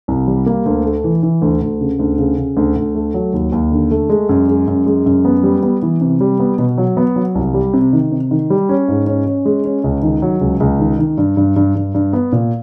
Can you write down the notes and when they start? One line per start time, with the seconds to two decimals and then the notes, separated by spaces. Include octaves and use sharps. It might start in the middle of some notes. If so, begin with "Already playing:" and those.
0.08 C2
0.27 G3
0.46 A#3
0.66 D2
0.85 A3
1.04 E3
1.23 E3
1.42 D2
1.61 D2
1.81 C#3
1.99 D2
2.18 C#3
2.38 C#3
2.57 D2
2.76 D2
2.95 A3
3.14 F#3
3.33 D#2
3.52 D#2
3.72 D3
3.91 A3
4.10 G#3
4.29 F#2
4.48 G#3
4.67 F#2
4.86 G#3
5.06 F#2
5.25 B3
5.43 G3
5.63 B3
5.82 E3
6.01 C3
6.21 G3
6.39 B3
6.58 B2
6.78 F#3
6.97 B3
7.16 F#3
7.35 C2
7.54 G3
7.73 C3
7.93 D#3
8.12 C3
8.31 D#3
8.50 G3
8.69 C#4
8.88 G#2
9.07 C#4
9.26 C#4
9.45 G#3
9.65 C#4
9.84 C#2
10.03 D#3
10.22 F#3
10.41 C#2
10.60 C#2
10.80 D#3
10.99 D#3
11.18 G2
11.37 G2
11.56 G2
11.75 G2
11.94 G2
12.13 B3
12.32 A#2